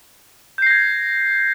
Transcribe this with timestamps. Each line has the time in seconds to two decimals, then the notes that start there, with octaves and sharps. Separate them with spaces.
0.58 G6
0.62 C7
0.66 A#6
0.71 G#6